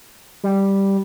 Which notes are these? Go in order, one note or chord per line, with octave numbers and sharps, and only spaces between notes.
G3